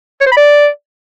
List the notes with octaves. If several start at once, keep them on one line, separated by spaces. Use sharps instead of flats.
C#5
C5
B5
D5